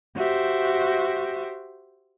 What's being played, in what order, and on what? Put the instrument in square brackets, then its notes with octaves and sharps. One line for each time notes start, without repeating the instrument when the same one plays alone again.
[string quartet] F#4 G4 C5 E5